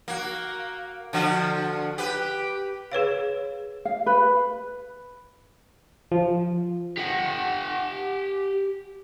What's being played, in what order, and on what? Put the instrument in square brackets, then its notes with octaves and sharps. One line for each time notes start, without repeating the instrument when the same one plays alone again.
[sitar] A#3 F#4
D3 F3 F#4
G4 B4
[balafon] G#4 B4 C#5 F5
[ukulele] F5
B4
[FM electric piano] F3
[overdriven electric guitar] G4 F#5